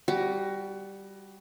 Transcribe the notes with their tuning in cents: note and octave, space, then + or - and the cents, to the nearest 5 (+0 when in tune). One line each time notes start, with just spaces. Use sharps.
G3 +0 F#4 +20